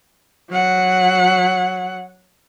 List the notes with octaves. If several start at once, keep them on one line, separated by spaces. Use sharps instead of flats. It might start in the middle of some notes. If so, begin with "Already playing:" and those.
F#3 F#5